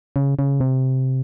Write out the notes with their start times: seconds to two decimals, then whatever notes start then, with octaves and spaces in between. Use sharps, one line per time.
0.16 C#3
0.39 C#3
0.60 C3